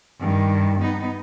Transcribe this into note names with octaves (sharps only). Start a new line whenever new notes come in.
G2 D#3
B3 D#4